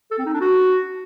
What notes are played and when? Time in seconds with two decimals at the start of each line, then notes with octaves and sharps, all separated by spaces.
0.11 A4
0.18 C4
0.26 D#4
0.33 D4
0.41 F#4